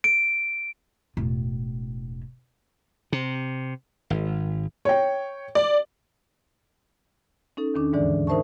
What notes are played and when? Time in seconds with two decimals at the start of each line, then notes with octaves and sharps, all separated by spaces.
0.04 D7
1.17 E1 A2
3.12 C3
4.10 G#1
4.85 C#5 G5
5.55 D5
7.57 C#4 D#4 A4
7.74 E2 D#3 C#4 D4
7.93 D#2 G#2 D3 E3 G#3 D5
8.27 D#4 A#4 C5 E5 A5 C#6